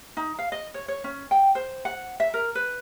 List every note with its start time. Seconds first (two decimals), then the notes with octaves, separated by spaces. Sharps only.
0.17 D#4
0.39 F5
0.52 D#5
0.74 C#5
0.88 C#5
1.04 C#4
1.31 G5
1.55 C5
1.85 F#5
2.20 E5
2.34 A#4
2.55 B4